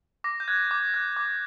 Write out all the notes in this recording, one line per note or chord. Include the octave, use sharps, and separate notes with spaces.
D6 A#6
G6
F#6 G#6
D6
F#6
D6